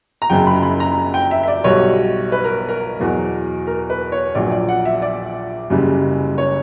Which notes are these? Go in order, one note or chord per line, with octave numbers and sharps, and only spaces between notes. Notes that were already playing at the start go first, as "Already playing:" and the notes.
A#5
F#1 F#2 C#3 G5
B5
B5
A#5
G5
E5
E5
D5
B1 B2 G3 C#5
B4
A#4
A#4
E2 B2 F#3
A#4
B4
C#5
A#1 A#2 F#3 D5
D5
F#5
E5
D5
F#1 F#2 C#3 G3
C#5